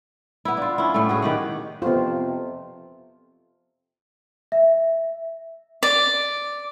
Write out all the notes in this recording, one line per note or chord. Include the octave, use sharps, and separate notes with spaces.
B3 E4
D4 F4
C#4 E4
A2 A3
F#4 G#4
D#3 G4 F#5
F2 C3 B3 F4
E5
D5